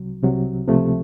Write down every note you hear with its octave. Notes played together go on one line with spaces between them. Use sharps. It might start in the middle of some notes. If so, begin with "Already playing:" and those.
Already playing: C2 C3 F#3
C2 C3 F#3
C#2 C3 F3 A3